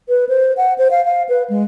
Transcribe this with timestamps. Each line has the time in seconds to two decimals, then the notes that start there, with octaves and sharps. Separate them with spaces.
0.09 B4
0.29 C5
0.57 F#5
0.78 C5
0.91 F5
1.05 F5
1.29 B4
1.50 G#3